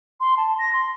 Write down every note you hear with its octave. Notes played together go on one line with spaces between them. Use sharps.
C6
A5
A#6
C6